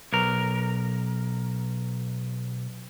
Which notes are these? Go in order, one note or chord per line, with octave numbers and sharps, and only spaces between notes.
B1 A#4